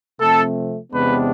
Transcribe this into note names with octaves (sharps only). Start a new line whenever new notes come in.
C3 F3 A3 C4 A4
E2 C3 G#3 B3 D4 B4